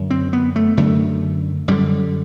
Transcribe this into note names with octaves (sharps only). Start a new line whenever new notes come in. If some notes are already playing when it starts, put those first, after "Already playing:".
Already playing: F#2 D3
C4
B3
A3
F#2 D3 A3
F#2 D3 G3